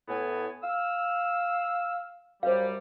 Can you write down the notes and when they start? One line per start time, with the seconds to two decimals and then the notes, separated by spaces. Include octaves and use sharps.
0.09 A2 B3 G#5
0.63 F5 E6
2.43 F#2 G3 C5 F5